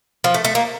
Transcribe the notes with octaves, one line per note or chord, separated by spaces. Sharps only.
F3
A3
A3
A#3